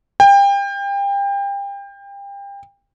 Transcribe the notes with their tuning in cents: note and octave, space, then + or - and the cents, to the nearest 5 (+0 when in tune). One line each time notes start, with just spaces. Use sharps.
G5 +30